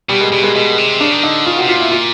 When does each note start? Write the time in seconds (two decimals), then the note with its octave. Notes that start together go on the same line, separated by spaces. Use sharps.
0.09 B2 G3
0.21 G#3
0.32 B2 G3
0.43 G#3
0.55 B2 G#3
0.78 C3
1.01 C#3 D4
1.12 D#3
1.23 D3 D#4
1.46 C#3 F4
1.57 C3 F#4
1.69 F4
1.76 A#2 E4
1.92 F4